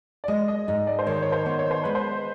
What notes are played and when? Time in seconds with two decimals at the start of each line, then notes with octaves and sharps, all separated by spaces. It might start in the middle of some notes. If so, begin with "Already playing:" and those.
0.24 D5
0.28 G#3 D#5
0.48 D#5
0.67 G#2 D#5
0.87 D5
0.99 C5
1.07 D#3 C#5
1.22 C#5
1.32 C5
1.46 B3
1.59 C#5
1.71 C5
1.83 G#3 B4
1.95 C5